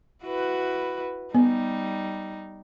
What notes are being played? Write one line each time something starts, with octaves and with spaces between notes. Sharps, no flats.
E4 F#4 B4
G3 B3 D#4